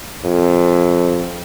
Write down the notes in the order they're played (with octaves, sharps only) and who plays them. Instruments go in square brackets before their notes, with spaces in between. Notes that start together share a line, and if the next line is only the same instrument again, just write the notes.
[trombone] F2